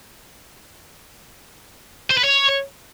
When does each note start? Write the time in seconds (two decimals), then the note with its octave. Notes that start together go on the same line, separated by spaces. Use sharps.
2.11 C5
2.18 B4
2.24 C#5